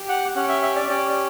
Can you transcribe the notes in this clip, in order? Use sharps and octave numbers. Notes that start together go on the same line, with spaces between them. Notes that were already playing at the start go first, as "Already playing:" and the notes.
Already playing: G4
F#5
C#4 G4 F#5
E5
E5
D5
C#4 G4 D5